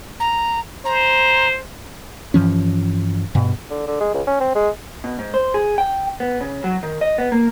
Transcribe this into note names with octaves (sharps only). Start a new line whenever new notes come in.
A#5
C5 A#5
G2 E3 F3 C#4
G2 B2
D3
D3
G#3
C#2
C#4
C4
G#3
B2
G#2
C5
G#4
G5
B3
C#3
F#3
D#3
D#5
B3
A#3